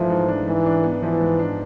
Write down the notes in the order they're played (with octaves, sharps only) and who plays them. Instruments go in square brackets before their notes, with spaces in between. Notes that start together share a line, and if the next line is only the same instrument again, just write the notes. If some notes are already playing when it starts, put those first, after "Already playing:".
Already playing: [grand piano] G#2 E3 A3 D4 [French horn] F3
[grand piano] G#2
D4
[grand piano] G#2 [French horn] E3
[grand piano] D4
B3
[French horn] E3 [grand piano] F3
[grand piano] G#2
D4